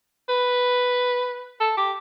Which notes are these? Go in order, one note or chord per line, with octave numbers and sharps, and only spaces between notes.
B4
A4
G4